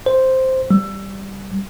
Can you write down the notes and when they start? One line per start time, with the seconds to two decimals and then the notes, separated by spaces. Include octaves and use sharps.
0.06 C5
0.71 G3